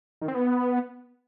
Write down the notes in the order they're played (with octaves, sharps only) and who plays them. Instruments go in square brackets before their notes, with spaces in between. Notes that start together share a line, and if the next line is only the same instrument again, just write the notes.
[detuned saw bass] D#3
C4
B3